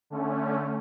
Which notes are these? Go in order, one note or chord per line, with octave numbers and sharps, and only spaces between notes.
D3 A3 C#4